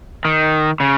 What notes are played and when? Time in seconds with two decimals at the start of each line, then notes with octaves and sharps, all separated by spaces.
0.25 D#3
0.80 C#3